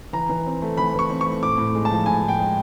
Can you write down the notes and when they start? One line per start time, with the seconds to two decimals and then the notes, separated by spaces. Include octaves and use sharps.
0.13 E3 A#5
0.29 E3
0.46 C4
0.62 A3
0.77 E3 B5
0.94 E3 C#6
1.10 C4
1.21 C#6
1.26 A3
1.43 A2 D6
1.58 A2
1.75 G#3
1.85 A5
1.91 F3
2.06 A2 G#5
2.22 A2
2.28 G5
2.39 G#3